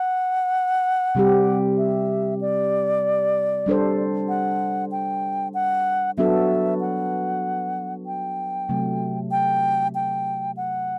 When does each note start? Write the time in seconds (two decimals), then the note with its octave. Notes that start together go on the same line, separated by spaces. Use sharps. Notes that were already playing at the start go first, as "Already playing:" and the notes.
Already playing: F#5
1.15 C3 G3 C4 G4
1.78 E5
2.41 D5
3.66 G3 D4 A4 C5
4.29 F#5
4.92 G5
5.54 F#5
6.18 F#3 B3 D4 F#4 A4 E5
6.81 F#5
8.06 G5
8.69 C3 F#3 A3
9.31 G5
9.95 G5
10.57 F#5